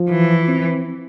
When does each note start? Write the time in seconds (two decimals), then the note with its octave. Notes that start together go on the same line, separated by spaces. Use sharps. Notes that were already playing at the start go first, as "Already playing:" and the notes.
Already playing: F3
0.10 E3
0.48 C4